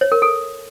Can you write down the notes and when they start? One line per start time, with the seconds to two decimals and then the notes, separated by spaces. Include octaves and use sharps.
0.01 C#5
0.12 A#4
0.22 A4